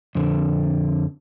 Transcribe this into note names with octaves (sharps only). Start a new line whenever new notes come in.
F2 D3